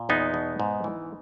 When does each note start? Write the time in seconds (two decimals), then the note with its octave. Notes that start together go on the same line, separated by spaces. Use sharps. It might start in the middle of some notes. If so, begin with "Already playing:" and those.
Already playing: A#2
0.09 E2 B3 D#4
0.34 B2
0.60 G#2
0.84 E3